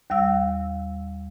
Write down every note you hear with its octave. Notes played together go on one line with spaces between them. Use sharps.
D#2 G3 F5 E6